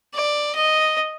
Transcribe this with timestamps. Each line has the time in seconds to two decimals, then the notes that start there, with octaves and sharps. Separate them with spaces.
0.14 D5
0.55 D#5